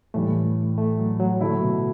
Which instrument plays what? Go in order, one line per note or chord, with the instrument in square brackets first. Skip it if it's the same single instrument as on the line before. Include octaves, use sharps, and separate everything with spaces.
[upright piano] A2 E3 G3 [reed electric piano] A3
[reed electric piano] A3
F#3
F#3
[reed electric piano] D3 [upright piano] F#3 A3 E4
[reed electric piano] B2